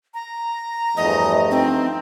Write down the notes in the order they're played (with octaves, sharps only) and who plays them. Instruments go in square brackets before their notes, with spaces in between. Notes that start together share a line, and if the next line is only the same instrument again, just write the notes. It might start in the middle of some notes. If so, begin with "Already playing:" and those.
[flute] A#5
[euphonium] E2 [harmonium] G2 F3 A3 [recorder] D#5
[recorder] C4 [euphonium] D#4